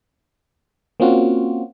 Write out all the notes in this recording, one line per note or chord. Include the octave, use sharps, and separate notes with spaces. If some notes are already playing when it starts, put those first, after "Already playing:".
A#3 C4 C#4 F4 F#4